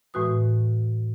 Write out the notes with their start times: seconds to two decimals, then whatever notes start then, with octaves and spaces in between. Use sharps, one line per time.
0.14 A2 E3 G#3 F#4 B4 D#6